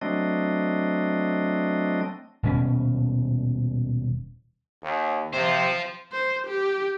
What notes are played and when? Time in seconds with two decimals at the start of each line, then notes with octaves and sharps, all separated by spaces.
0.02 F#3 A3 C4 D4 D#5
2.43 D#1 B2 C#4
4.83 D#2
5.33 C3 F4 C5
6.12 C5
6.47 G4